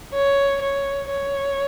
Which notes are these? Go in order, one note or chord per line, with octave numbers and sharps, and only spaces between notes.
C#5
C#5
C#5